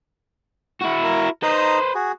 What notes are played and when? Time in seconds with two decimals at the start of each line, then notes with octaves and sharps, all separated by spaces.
0.81 E4 F#4
1.03 A#4
1.43 D#4 B4 C5 A#5 D#6
1.95 F#4 G#4